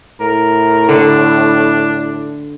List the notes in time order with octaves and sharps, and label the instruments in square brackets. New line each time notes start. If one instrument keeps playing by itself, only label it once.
[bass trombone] A2 [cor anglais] A#4
[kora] D3 [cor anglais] D4